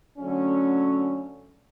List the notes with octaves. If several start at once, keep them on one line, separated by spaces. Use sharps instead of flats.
D3 F#3 A3 C#4